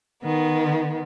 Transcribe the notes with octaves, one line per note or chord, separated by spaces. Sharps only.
D#3 B3